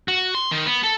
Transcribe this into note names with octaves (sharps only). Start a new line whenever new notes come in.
F#4
C6
D#3
B3
A4